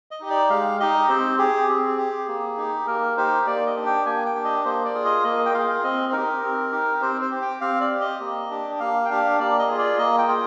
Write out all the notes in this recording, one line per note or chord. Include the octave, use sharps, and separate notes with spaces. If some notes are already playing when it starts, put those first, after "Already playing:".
D#5
D#4 G4
D5
G#3 F5
D#4 G4 D#5
C4 C5
G4 G#4
C4
G4
A#3
D#4 G4
A#3 A#4
D#4 G4 C5
A#3 D5
D#5
D4 G4
G5
A#3 G#5
G5
D4 G4
D#5
A#3 C5
D5
F4 G#4
D#5
A#3 D#5
G5
F4 G#4 F5
C4 D#5
D#4 G4 A#4
C4
D#4 G4
C4 C5
C5
G4
G5
C4 F5
D5
G4
D#5
A#3
D4 G4
A#3 F5
G5
D4 G4 F5
A#3 D5
D#5
F4 G#4
D5
A#3 D#5
G5
F4 G#4